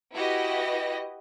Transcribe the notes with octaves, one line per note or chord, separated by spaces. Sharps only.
E4 F#4 G4 B4 D#5 A#6